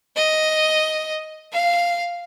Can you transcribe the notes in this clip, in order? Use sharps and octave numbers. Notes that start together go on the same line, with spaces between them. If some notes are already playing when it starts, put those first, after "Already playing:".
D#5
F5